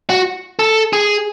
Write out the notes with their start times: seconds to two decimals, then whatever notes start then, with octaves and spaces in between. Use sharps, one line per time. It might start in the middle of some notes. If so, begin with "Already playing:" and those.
0.10 F#4
0.59 A4
0.93 G#4